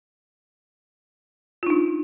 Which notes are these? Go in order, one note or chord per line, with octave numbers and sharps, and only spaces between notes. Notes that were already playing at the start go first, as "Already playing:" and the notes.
D4 D#4 F4